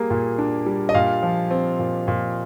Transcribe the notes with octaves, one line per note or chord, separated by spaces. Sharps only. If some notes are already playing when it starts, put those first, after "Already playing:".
Already playing: G3 A#3 G#4
A#2
D4
G3
D#5
A#2 F5
F3
C4
A#2
A#2